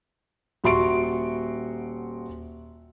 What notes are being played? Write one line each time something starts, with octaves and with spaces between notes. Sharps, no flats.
D#1 F#4 E5 C6 C#6 D7